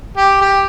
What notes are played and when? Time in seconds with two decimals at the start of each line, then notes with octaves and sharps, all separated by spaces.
0.17 G4
0.41 G4